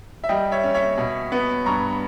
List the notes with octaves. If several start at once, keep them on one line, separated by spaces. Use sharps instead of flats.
E5
G3 D#5 G5
C#5 E5
C#4
C#5 E5
B2
B3
G2 A#5 C#6